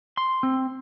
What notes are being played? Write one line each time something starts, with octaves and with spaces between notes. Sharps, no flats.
C6
C4